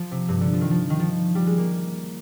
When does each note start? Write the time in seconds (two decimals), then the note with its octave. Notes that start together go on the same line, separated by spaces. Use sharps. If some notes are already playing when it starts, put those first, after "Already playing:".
Already playing: F3
0.11 C3
0.29 G2
0.41 D3
0.53 F3
0.61 D#3
0.71 F3
0.90 D#3
1.00 F3
1.35 G3
1.47 G#3
1.58 A#3